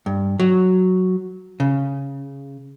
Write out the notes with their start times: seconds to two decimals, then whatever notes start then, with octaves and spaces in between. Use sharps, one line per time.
0.06 G2
0.40 F#3
1.60 C#3